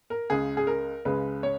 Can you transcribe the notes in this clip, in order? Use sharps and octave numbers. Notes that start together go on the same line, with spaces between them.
A#4
C#2 C#3 G#3 G#4
G#4
A#4
C#2 C#3 G#3 B4
C#5